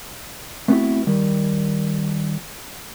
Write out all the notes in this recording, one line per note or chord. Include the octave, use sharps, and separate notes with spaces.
A3 B3 C4 D4 E4 F#4
D#3 G3